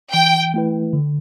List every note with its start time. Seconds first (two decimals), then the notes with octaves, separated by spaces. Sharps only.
0.14 E3 G5
0.54 A3 E4 B4
0.93 D3